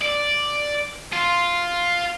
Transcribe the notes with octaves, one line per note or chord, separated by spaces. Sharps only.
D5
F4